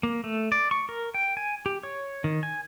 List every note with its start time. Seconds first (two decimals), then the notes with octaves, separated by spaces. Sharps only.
0.03 A#3
0.24 A3
0.52 D5
0.71 C#6
0.89 A#4
1.14 G5
1.37 G#5
1.66 G4
1.83 C#5
2.24 D#3
2.43 G#5